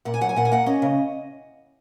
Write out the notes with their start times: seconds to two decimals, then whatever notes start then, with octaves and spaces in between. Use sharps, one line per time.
0.05 A#2 F#5
0.14 G#5
0.21 F#3 F#5
0.29 G#5
0.36 A#2 F#5
0.45 G#5
0.51 A#3 F#5
0.66 C#4 D#5
0.82 C#3